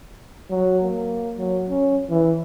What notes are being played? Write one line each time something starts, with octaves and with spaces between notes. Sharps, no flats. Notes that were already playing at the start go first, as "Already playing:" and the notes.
F#3
A#3
F#3
C#4
E3